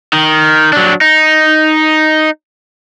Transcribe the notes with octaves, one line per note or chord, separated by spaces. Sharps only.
D#3
F#3 D4
D#4